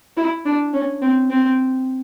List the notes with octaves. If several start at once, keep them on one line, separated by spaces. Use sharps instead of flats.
E4
D4
C#4
C4
C4